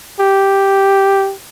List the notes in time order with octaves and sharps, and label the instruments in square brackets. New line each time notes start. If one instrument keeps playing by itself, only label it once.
[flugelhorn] G4